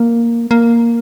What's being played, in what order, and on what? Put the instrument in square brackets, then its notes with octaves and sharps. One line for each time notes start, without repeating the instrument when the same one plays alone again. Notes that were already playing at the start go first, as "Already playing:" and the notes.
Already playing: [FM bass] A#3
A#3